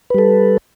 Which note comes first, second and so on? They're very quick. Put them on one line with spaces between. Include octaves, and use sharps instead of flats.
B4 G3 A4